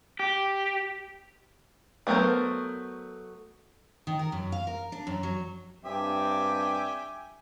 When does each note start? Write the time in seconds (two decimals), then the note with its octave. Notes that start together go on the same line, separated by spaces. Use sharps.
0.19 G4
2.07 F#3 A3 B3 A#4 C5
4.07 D#3
4.19 A#4
4.32 F#2
4.52 F5
4.67 A#4
4.92 D4
5.07 F#2
5.23 F#3
5.85 G2 C4 G4 E5 G#5 D6